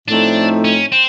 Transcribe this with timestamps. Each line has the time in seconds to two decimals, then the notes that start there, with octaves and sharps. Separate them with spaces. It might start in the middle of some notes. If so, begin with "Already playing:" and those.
0.08 A2 F3 A3 C4 D4 D#4
0.65 C#4
0.92 C4